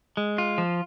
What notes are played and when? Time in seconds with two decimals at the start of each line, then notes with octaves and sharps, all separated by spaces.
0.17 G#3
0.38 F4
0.58 F3